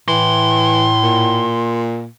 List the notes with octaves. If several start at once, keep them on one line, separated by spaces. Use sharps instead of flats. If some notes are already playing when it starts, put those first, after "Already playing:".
A2 E3 C6
A#2